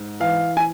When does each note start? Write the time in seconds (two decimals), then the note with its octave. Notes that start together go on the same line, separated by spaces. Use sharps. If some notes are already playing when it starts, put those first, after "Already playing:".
Already playing: G#2
0.20 E3 F5
0.57 G#5